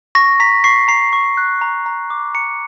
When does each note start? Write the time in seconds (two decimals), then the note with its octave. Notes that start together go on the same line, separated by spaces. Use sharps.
0.15 C#6 A#6
0.40 A#5 B6
0.64 C#6 C7
0.88 A#5 C7
1.13 C#6
1.37 F#6
1.62 A#5
1.86 A#5
2.10 D6
2.34 A#5 C#7